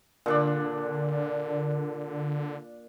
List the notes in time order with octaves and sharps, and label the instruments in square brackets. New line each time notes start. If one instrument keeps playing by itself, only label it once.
[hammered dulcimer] A#2 D4 D5 [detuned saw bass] D3